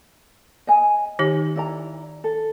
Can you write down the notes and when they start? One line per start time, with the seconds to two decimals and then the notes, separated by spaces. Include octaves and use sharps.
0.67 D#5 G#5
1.19 D#3 D#4 G4
1.56 E4 D5 A#5
2.24 A4